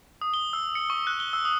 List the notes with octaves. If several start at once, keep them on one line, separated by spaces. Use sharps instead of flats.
D#6
G7
E6
C#7
C#6
F#6
G7
E6
D#6